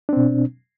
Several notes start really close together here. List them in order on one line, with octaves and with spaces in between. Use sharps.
D4 C4 B2